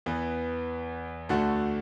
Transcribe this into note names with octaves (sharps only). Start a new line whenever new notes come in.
E2 E3 B3
D2 D3 A3 F#4 A4